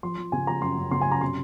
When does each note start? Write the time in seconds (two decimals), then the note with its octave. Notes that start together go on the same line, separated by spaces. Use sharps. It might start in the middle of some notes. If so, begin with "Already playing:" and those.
0.03 F3 C6
0.17 F3
0.32 C#3 G#5
0.47 F3 A#5
0.62 F#2 C6
0.78 F#2
0.91 C#3 C6
1.01 G#5
1.06 F#2
1.11 A#5
1.21 C3 C6